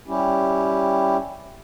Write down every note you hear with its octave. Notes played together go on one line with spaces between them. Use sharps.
G3 C#4 E4 G4